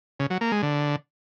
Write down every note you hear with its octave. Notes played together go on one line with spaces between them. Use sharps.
C#3
F#3
A#3
G#3
D3